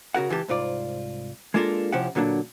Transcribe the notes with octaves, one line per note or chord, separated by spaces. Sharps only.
C#3 F#4 A#4 F#5
C#2 E3 F4 G4 A5
C2 G#2 F4 D5
G#3 A#3 D4 F4 A4 A#4
C3 F3 C#4 E4 G4 F#5
A#2 D3 F#3 A#3 D4